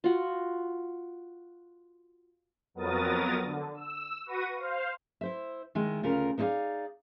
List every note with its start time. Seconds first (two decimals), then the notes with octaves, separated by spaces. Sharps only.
0.04 F4 F#4
2.74 F2 F#3 B3 A#4 D#6 A6
3.43 D3
3.75 E6
4.25 F#4 B4 C#6 A#6 D#7
4.56 C5 F5
5.21 E4 C5 E5
5.75 D#3 G#3 E4
6.03 D2 C#3 F4 A#4
6.38 B3 D#4 E4 G#4 D5 F5